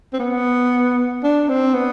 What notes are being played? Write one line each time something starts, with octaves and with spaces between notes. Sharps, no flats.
C4
B3
D4
C4
B3